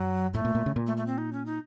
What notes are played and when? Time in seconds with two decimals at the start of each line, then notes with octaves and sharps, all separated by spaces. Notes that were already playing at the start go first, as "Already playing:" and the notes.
Already playing: F#2 F#3
0.34 A2 A3
0.45 A#2
0.55 A#2
0.66 C#3
0.76 A#2
0.87 A3
0.97 A3
1.07 C4
1.18 D#4
1.33 C#4
1.46 D#4